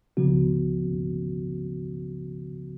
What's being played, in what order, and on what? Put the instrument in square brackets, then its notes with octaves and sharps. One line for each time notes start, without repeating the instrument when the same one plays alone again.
[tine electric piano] C#3 F3 B3 F#4